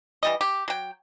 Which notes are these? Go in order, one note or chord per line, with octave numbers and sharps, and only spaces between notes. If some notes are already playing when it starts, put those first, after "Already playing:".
E3 G3 D#5
G4
F#3 G5